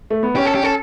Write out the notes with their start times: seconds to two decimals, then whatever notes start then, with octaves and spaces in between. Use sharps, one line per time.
0.10 A3
0.23 B3
0.36 C#4 G4
0.46 A4
0.55 G4
0.63 C#4 A4